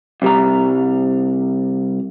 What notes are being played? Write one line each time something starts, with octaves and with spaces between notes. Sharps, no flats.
C2 G3 A#5